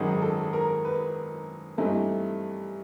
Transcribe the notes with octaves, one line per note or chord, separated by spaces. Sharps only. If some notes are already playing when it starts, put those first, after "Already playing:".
Already playing: G#1 F#2 D#3 G#4
A4
A#4
B4
G2 E3 A3 C4 D#4